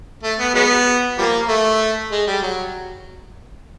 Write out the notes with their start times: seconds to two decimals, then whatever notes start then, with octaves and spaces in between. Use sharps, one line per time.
0.23 A3
0.39 B3
0.55 F#3 G#3 B3
1.18 F3 G3 A#3
1.48 A3
2.11 G#3
2.27 G3
2.42 F#3